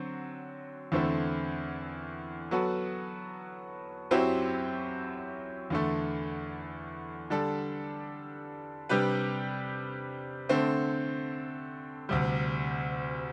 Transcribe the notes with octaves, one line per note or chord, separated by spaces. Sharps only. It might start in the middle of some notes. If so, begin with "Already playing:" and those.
Already playing: D3 F#3 C4
E2 D3 A3 C4 E4
F#3 B3 F#4 A4
F#2 F#3 C4 E4 G4
E2 D3 A3
D3 G3 D4 A4
C3 G3 D4 G4 B4
D3 A3 C4
D2 C3 G3